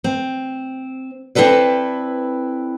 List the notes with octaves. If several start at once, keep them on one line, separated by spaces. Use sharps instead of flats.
C4
C4 E4 A4 B4 D5